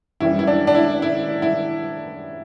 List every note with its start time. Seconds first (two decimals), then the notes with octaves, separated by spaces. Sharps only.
0.20 F#2 E3 G3 E4
0.39 E4
0.47 D4
0.67 D4
0.75 E4
1.02 E4
1.42 E4